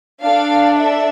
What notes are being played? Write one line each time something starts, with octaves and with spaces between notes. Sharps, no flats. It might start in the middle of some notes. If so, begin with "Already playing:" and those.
D4 A4 F5
E5